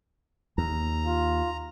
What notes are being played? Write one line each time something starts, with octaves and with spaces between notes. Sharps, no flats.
D#2 A#5
F4